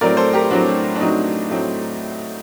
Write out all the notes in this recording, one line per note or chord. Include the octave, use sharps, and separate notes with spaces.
A2 F#3 C4 A#4 D5
A4 C5
G4 A#4
A2 F#3 C4 D4 F#4
D4
A2 F#3 C4 D#4
A2 F#3 C4